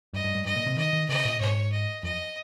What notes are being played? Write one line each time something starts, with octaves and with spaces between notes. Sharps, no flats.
G2 D#5
G2
G2
G2 D#5
A#2
C3
D#3 D#5
D#3
C#3 D#5
A#2
G#2 C#5
D#5
F2 D#5